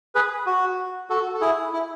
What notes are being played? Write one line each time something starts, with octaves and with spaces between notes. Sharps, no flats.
G#4 B4
F#4
F#4 A4
A4
E4 G#4
E4